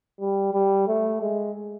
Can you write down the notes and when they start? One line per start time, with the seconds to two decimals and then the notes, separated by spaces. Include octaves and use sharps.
0.20 G3
0.53 G3
0.88 A3
1.22 G#3